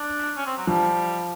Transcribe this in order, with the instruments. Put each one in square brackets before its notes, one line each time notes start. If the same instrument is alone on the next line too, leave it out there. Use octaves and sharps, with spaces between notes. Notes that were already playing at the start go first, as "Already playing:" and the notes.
Already playing: [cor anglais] D4
C#4
C4
F#3
[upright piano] F3 [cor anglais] G3